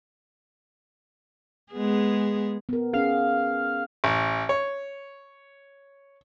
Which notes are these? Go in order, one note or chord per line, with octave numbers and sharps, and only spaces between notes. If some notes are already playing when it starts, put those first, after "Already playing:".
G#3 B3 G#4
B3 A#4
C#4 G#4 F5
A1
C#5